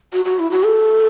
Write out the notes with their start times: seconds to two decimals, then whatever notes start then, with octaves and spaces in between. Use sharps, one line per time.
0.13 F#4
0.25 F#4
0.39 E4
0.51 F#4
0.65 A4